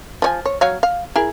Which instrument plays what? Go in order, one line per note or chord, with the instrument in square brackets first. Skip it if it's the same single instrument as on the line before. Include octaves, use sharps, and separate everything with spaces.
[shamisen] F3 C#5 G#5
C#5
F#3 C#5 F5
F5
E4 G#4 A#4